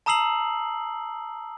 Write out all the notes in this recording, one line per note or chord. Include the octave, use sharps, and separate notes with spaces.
A5 A#5 D#6 E6 C7 F#7